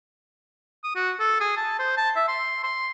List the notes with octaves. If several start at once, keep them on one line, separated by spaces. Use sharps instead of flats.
D#6
F#4
A4
G#4
A5
C5
A5
E5
C6
C6